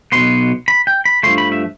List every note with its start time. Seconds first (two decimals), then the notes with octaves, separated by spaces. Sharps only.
0.12 B1 B2 B3 C6
0.68 B5
0.87 G5
1.05 B5
1.23 G2 F3 A3 C6
1.38 B5
1.52 E5